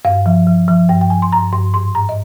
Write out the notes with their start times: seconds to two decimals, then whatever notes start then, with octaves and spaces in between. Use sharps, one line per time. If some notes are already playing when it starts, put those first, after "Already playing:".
0.05 G2 F5
0.26 F3
0.47 F3
0.68 F3
0.89 G2 G5
1.01 G5
1.10 F3 G#5
1.22 C6
1.32 G2 A#5
1.53 G2 C6
1.74 G#2 C6
1.95 G#2 A#5
2.09 D#5